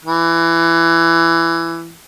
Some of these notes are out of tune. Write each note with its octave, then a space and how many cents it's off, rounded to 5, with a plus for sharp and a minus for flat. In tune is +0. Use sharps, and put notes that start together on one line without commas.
E3 +15